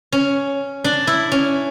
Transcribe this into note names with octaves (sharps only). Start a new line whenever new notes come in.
C#4
D4
E4
C#4